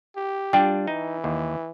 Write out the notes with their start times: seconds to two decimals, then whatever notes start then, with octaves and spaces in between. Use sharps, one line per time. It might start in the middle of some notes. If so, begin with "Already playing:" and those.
0.16 G4
0.53 G3 D4 F4 G5
0.87 E3 D#4
1.24 D#2